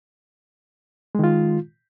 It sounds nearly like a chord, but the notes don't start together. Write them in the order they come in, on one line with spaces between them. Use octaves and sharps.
G#3 D#3 F4